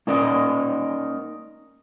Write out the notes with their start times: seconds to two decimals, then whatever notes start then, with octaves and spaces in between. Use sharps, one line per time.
0.07 A#3 C#4 D#4 A#4 D5